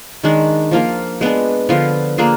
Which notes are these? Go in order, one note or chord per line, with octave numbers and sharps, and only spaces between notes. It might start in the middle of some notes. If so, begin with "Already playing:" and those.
D#3 G#3 D4
F3 A#3 F4 A#4
G#3 B3 D4
D3 F3 B3 F4
A#3 D4 F4 G#4